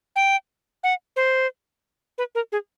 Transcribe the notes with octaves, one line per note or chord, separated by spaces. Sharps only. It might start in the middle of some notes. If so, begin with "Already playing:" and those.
G5
F#5
C5
B4
A#4
G#4